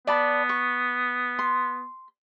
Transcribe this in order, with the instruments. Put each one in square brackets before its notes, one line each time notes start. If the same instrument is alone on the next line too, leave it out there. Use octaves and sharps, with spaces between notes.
[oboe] B3 [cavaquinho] D5 A5 B5
[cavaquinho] C#6
C6